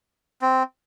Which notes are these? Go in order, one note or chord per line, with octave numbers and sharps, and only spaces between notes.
C4